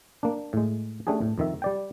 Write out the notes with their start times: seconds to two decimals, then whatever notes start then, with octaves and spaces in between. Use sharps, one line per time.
0.23 A#3 D4
0.53 A2 G#3
1.07 A3 C#4 D4 G4 G#4
1.21 A2
1.38 F2 D#3 E5
1.62 G3 D5 G5